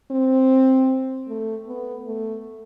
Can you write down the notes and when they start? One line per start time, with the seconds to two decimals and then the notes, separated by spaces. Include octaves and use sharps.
0.11 C4
1.28 A3
1.67 B3
2.07 A3